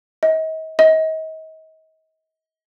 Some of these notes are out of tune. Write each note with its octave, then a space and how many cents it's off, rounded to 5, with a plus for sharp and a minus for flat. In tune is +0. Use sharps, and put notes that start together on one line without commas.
D#5 +40
D#5 +35